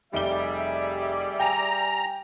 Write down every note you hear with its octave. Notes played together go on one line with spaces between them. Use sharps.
F1 G3 G#4 D5 E5 G7
G5 G#5 A#5